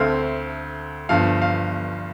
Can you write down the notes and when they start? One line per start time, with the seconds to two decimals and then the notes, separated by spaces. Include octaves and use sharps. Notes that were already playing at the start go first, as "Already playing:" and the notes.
Already playing: D2 D3 A3 C4 F5
1.09 G1 G2 F3 F5
1.42 F5